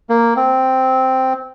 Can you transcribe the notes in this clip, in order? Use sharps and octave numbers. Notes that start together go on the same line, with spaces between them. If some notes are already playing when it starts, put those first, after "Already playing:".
A#3
C4